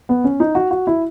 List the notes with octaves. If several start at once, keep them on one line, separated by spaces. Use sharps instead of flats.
B3
C#4
D#4
F#4
F#4
E4